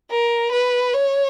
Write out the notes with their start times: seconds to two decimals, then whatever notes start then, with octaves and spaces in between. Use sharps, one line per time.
0.11 A#4
0.52 B4
0.94 C#5